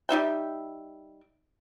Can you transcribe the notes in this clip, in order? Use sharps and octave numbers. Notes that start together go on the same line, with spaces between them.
G3 D#4 E5 G5